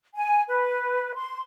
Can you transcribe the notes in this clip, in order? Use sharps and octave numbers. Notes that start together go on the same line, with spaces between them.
G#5
B4
C6